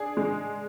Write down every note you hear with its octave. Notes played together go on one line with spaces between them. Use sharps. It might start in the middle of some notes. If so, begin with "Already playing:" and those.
Already playing: D4 G#4
G#3